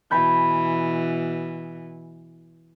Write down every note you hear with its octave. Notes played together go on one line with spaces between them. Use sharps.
B2 E3 G#5 B5 G6